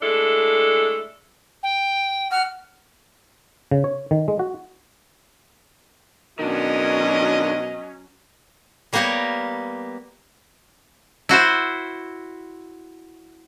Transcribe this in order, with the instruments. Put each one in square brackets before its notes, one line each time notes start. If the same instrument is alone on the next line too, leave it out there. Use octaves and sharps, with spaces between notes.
[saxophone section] G#3 A3 D4 E4 A4
[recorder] G5
[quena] F#5 [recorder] F6
[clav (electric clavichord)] C#3
C#5
D#3
G#3
F#4
[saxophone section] B2 A#4 [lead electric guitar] D#3 D4 [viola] F#3 C#4 [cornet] D#5
[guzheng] G3 A#3 B3 G4 A#4 C#5
[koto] E4 F#4 C5